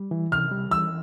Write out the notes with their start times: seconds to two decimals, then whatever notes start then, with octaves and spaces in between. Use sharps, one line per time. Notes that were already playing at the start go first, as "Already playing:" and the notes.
Already playing: G3
0.11 E3
0.31 C3 F6
0.52 G3
0.71 E3 E6